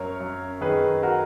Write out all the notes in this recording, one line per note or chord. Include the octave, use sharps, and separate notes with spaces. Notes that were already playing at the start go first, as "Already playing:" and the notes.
Already playing: F#2 A#4 C#5
F#2
D#3 G#4 B4
F#4 A#4